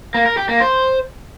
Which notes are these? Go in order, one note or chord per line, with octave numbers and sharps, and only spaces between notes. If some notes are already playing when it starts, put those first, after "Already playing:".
A#3
A#4
G4
A#3
C5